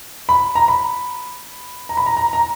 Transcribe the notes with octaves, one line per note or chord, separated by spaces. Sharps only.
B5
A#5
B5
A#5
B5
A#5
A#5
A#5